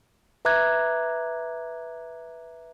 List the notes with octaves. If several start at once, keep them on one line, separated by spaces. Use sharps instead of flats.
B4 E5 A#5 D6 F#6 G#6